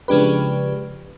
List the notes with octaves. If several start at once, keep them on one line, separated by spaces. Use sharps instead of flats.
C#3 F3 G#3 D4 G4 B4